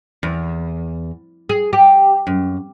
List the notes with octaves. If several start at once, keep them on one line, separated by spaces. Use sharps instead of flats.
E2
G#4
G4
F#2